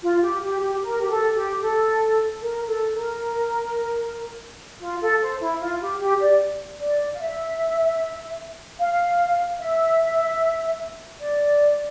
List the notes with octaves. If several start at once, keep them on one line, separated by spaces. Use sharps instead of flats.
F4
G4
G4
G4
A#4
G4
A4
G4
A4
A#4
A4
A#4
F4
A4
C5
E4
F4
G4
G4
D5
D5
F5
E5
F5
E5
D5